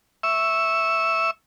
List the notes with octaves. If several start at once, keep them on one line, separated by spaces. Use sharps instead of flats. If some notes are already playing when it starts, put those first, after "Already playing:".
E5 C#6 E6